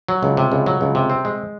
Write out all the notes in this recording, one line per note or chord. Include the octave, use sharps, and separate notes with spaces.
F#3
C#2
C3
C#2
F#3
C#2
C3
C4
G#3